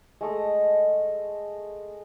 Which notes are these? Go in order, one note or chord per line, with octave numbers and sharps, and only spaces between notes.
G#3 A3 D#5